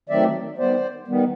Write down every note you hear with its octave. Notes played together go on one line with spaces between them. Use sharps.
D#3 F#3 A3 C4 D5 E5
D#3 G3 B3 C5 D5
D#3 G3 B3